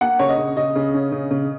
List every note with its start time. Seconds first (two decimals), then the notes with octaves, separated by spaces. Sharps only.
0.01 A#3 F#5
0.19 C#3 C#5
0.29 D#5
0.38 C#3
0.57 C#3 D#5
0.76 C#3
0.94 C#4
1.12 C#3
1.31 C#3